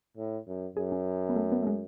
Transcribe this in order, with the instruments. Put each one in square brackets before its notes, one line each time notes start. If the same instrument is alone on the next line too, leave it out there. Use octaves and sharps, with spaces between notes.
[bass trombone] A2
F#2
[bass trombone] F#2 [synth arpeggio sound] G#4
[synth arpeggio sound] C#4
B3
A3
B3
A3
G#3